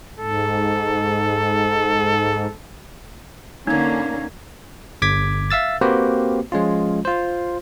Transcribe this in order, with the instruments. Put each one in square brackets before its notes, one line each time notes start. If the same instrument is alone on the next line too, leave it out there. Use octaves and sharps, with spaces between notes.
[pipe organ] G#2 [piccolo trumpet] A4
[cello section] D3 A#3 C#4 [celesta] D#4 G#6
[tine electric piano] G1 D6 G#6 B6
E5 F5 E6 A6
A#3 C4 F#4 G4 B4 C5
F3 G#3 C#4 F4
F4 C5